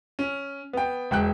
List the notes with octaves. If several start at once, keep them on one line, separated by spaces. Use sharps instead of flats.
C#4
B3 G5
E1 G5 F#6